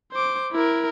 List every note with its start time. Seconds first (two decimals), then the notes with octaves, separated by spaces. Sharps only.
0.12 C5 D6
0.52 E4 A#4